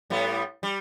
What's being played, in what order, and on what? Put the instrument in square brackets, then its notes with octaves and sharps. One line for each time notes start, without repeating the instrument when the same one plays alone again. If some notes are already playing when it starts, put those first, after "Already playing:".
[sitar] A2 G3 B3
G3